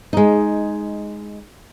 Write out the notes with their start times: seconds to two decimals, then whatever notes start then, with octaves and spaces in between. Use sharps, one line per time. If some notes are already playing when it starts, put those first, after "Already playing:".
0.13 G#3 D#4